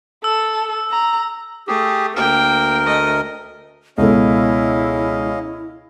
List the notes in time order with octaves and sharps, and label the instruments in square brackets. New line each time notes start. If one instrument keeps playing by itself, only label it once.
[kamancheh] A4 [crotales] E6
[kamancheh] A#5
[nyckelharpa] A3 [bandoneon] G4 G#4
[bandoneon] D2 A#4 [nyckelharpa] A#3 G5
[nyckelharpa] A3 D#5
[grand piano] C#2 B2 A4 [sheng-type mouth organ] C#4 D#5 F5 [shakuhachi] E4